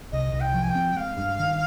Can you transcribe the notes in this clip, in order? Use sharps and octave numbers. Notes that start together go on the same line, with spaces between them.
C2 D#5
C2
G5
F3
G#5
G5
C4
G#3 F5
G2
D#3